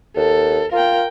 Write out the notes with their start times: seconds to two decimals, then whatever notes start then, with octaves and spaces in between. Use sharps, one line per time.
0.16 D#2 A4
0.72 F4 A#4 G5